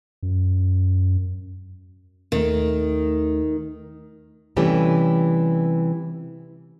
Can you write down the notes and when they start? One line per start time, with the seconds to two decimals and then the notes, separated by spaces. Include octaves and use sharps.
0.23 F#2
2.32 D#2 D#3 A3
4.57 C3 E3 G3 A3 C#4 G4